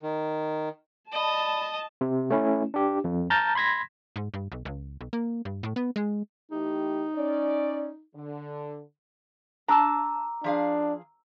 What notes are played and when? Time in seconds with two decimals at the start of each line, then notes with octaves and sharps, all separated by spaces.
0.03 D#3
1.12 D5 D#5 A5 B5
2.01 C3
2.30 A3 C#4 E4
2.74 D4 G4
3.04 F2
3.30 A5 A#5 F6 G6 A6
3.55 B5 C6 G#6 A#6 B6
4.16 G#2
4.34 G2
4.52 B1
4.65 C#2
5.01 B1
5.13 A#3
5.45 G2
5.63 A2
5.76 B3
5.96 G#3
6.52 E3 A3 D#4 G4
7.15 C#4 D5
8.15 D3
9.68 D4 A5 A#5 D6 E6
10.44 F3 D4 G#4 F5